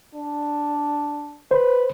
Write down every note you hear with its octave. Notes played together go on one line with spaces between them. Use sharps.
D4
B4 C5